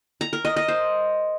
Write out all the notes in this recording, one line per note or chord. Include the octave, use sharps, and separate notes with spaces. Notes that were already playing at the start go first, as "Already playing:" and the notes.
A#5
A#4
D#5
D#5
C5